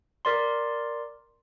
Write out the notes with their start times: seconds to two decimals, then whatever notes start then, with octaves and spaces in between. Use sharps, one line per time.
0.25 A#4 D5 C6